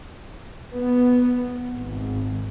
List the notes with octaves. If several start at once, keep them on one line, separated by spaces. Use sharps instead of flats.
B3
G#1